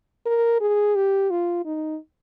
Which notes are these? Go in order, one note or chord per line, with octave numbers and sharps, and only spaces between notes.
A#4
G#4
G4
F4
D#4